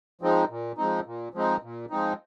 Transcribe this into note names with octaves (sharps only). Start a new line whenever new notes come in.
F3 G#3 C4 D#4
A#2
F3 G#3 C4 D#4
A#2
F3 G#3 C4 D#4
A#2
F3 G#3 C4 D#4